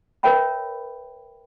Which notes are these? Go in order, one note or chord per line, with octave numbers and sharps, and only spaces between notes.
A#4 B4 C#5 E5 G5 B5